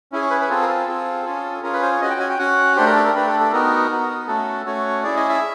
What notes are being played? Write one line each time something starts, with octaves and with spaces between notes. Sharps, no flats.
C#4 E4 G#4
C#5
B4
B4
C4 F4 G#4 A4
A#4
A4
C4 F4 G#4
C#4 F4 G#4
C#4 F4 G#4 A#4
B4
C5
C#5
C#4 F#4 D#5
G5
G#5
G5
C#4 F#4 F#5
A3 D4 G4 C5
A#4
A4
A#4
A3 D4 G4 B4
A4
A4
B3 D#4 F#4 A#4
B3 D#4 F#4
A3 C#4 F#4 A4
A3 C#4 F#4 C#5
C#4 E4 G#4 D5
D#5
E5